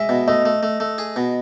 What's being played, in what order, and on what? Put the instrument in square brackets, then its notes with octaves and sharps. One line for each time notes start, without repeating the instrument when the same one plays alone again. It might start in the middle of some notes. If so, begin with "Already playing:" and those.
Already playing: [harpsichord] G#3 [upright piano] D#5 E5
[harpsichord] B2
[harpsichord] A3 [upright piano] D#5
[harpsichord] A3
A3
A3
G#4
B2